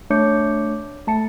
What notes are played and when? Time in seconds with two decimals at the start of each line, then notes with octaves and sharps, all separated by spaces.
0.10 A3 D4 C#5 D6 G6 C#7
1.07 A3 A5 C#7